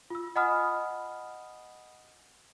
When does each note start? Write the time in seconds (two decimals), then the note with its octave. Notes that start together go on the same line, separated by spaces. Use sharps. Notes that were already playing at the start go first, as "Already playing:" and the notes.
0.10 F4 E6
0.36 D#5 F#5 G#5 B5 D#6 F6